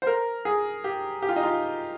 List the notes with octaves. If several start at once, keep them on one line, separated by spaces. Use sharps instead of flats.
C5
A#4
G#4
G4
G4
F4
D#4
F4